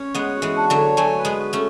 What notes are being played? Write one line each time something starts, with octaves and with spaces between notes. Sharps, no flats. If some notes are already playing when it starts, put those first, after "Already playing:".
Already playing: C#4 C#5
G#3 B3 F#5
F#4
E3 G#3
D4
D3 F#3
C#5
F#3 A3 G#5
B4
G#3 B3
F#4
A3 C#4